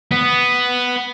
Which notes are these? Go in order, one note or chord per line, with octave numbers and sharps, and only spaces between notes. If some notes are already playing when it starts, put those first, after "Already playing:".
B3